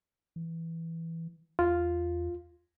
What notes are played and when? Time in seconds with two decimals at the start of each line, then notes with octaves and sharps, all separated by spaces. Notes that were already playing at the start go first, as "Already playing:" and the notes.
0.36 E3
1.59 E2 F4